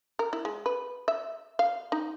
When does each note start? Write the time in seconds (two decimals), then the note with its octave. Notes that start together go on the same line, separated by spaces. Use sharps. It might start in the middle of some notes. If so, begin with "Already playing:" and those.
0.19 A#4
0.33 E4
0.45 G#3
0.66 B4
1.08 E5
1.59 F5
1.92 D#4